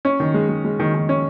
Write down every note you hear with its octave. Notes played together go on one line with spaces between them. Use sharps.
C#4
D#3
G#3
G#3
G#3
D#3
D#3
C#4